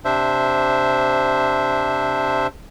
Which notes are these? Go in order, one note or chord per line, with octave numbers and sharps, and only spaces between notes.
C3 D4 C5 E5